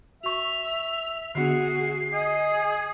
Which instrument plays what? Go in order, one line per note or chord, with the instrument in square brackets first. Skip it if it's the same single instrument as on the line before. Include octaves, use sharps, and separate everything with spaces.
[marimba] F#4 C#6 [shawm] E5 [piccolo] F7
[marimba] D3 B3 D4 [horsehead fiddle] F#4 G#4 [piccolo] C7
[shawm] G#4 [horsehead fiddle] D#5